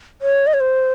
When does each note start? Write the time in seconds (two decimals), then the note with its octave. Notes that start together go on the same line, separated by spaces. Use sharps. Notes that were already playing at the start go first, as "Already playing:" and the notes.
0.22 C#5
0.47 D#5
0.54 C#5
0.60 C5